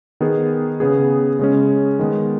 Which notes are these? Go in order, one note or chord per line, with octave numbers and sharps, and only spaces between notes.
D#3 B3 G#4
C#3 B3 G#4
C#3 G#3 C#4
D#3 G#3 B3